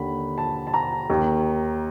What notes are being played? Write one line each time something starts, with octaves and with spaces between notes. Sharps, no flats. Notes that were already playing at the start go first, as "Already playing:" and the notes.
Already playing: D#2 D3 B5
A5
A5
A#5
D#2 D#3